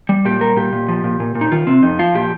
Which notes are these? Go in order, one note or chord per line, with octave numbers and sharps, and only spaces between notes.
G3
A#2 G4
G3 A#4
A#2 G4
A#2
F3
A#2
A#2
A#2
D#4
D#3 F4
C3 C4
F2 D#4
F3 F4
A#2 G4